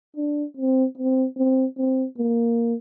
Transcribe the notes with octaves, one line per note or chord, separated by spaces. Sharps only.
D4
C4
C4
C4
C4
A#3